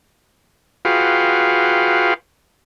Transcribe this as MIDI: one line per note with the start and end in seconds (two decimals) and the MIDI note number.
0.85 2.14 65
0.85 2.14 66
0.85 2.14 68
0.85 2.14 71
0.85 2.14 77
0.85 2.14 79